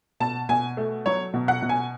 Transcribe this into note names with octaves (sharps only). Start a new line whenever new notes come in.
B2 A5
B2 G#5
A3
F#3 C#5
B2
F#5
B2
G#5